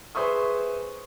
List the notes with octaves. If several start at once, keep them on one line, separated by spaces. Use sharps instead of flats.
G#4 B4 C5 E5 C#6 D#6